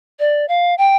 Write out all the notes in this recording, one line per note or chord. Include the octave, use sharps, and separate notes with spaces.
D5
F5
G5